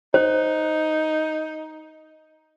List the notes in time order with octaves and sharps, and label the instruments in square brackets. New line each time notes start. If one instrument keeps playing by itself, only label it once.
[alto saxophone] D#4 [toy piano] C5